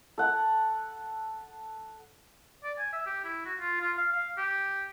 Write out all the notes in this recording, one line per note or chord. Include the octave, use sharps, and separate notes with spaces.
A4 F#5
D5
G#5
E5
G4
E4
F#4
F4
F4
F5
F5
G4